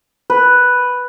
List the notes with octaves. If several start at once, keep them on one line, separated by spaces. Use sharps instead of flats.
B4